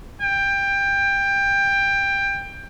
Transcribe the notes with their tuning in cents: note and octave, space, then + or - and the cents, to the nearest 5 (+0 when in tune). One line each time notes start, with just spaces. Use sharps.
G5 +20